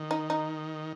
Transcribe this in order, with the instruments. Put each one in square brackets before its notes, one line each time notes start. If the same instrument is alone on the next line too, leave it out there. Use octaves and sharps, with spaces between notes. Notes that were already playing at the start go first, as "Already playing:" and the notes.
Already playing: [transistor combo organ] D#3
[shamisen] D#4
D#4